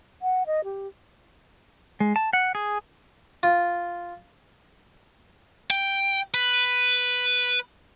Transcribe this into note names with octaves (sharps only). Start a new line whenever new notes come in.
F#5
D#5
G4
G#3
A5
F#5
G#4
F4
G5
B4